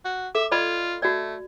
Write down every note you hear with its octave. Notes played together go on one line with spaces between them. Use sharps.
F#4
A4 E5 D6
F4 D5 D#5 B5
A3 F#4 D5